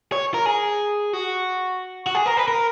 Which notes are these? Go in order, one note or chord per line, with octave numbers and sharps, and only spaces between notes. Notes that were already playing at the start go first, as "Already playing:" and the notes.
C#5
A#4
G#4
F#4
F#4
G#4
A#4
B4
A#4